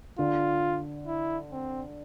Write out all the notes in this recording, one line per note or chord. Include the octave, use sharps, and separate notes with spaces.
D3 F4
E4
C4